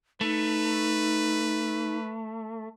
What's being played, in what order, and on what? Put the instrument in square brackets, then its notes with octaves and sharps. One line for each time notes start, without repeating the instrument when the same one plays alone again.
[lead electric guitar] A3 [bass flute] D#4 [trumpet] B4